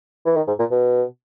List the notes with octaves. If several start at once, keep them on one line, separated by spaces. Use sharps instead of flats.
E3
D#3
G#2
A#2
B2